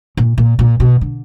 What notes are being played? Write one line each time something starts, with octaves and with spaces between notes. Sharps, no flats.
A#2
A#2
A#2
B2
D3